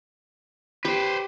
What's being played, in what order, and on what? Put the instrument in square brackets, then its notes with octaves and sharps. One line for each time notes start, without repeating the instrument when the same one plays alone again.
[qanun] G4 [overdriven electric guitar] B4 C5